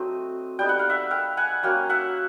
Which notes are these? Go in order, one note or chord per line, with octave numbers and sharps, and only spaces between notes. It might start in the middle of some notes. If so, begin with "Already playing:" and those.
Already playing: F#3 A3 C4 D#5
G3 B3 D#4 G5
F#5
F5
E5 F#5
F5 G5
F#5 G#5
F#3 A#3 C#4 F5 G5
E5 F#5